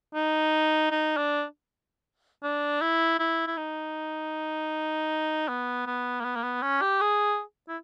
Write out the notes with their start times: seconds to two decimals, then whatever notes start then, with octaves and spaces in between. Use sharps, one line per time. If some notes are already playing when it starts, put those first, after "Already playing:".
0.15 D#4
0.91 D#4
1.17 D4
2.43 D4
2.82 E4
3.19 E4
3.47 E4
3.57 D#4
5.48 B3
5.87 B3
6.20 A#3
6.24 B3
6.36 A#3
6.43 B3
6.62 C#4
6.82 G4
7.01 G#4
7.68 E4